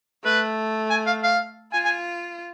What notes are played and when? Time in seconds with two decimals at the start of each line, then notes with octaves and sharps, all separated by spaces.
0.24 A3 B4
0.90 G#5
1.07 F5
1.24 F5
1.72 F4 G#5
1.85 G#5